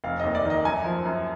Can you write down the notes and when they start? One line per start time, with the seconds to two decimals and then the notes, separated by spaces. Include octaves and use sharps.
0.04 F1 F5
0.20 D#2 D#5
0.35 D5
0.45 D#3
0.50 D#5
0.65 F#2 G#5
0.84 F3
1.05 F#2